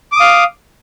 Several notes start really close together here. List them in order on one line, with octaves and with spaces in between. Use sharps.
D6 D#6 F5